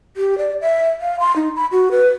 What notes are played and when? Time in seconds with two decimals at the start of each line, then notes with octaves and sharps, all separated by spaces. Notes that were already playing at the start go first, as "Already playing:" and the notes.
0.17 G4
0.38 D5
0.61 E5
1.01 F5
1.20 C6
1.36 D#4
1.56 B5
1.72 F#4
1.91 B4